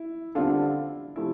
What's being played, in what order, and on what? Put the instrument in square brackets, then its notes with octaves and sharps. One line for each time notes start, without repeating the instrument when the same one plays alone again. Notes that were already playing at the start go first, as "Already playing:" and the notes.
Already playing: [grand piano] E4
[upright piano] D3 G3 C4 F4 A4 [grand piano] D4
[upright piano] C3 F3 A3 E4